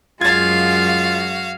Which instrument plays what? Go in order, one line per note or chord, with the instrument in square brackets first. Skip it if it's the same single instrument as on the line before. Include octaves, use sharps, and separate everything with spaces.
[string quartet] F#2 G#3 [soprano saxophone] F4 [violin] F#4 F5 [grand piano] G#6 A6